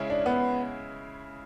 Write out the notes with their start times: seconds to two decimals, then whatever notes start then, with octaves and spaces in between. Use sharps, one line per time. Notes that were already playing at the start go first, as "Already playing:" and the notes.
Already playing: C#3 G#3 C#4 E4
0.10 D4
0.26 B3